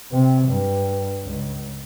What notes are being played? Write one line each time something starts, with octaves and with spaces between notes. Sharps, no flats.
C3
G2
C#2